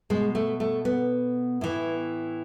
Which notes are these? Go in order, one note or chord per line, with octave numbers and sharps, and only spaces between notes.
B2 G#3
A3
A3
B3
A2 E3